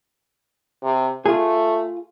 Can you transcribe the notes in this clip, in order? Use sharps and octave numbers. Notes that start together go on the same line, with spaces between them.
C3
A3 F4 G#4